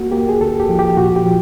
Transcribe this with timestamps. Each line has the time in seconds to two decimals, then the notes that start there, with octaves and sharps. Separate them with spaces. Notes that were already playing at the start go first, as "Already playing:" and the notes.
Already playing: A#3 F#4
0.11 A#3 G4
0.29 G#4
0.41 D2 A4
0.60 G4
0.69 F3
0.79 G4
0.97 A#2 F#4
1.16 G4
1.25 F3